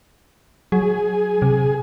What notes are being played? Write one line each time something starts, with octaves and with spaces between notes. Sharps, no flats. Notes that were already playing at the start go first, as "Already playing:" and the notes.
F#3 G#4
C3